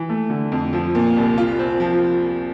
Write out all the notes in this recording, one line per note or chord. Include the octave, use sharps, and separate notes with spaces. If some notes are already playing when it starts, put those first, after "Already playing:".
Already playing: E3
A3
D3
F2
F3
A#2
C2
F4
C4
F3